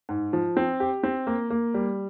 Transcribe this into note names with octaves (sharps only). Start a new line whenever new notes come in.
G#2
F3
C4
G4
C4
A#3
A#3
G3